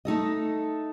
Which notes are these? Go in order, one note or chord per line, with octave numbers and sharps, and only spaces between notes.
A3 D#4 A4 D#5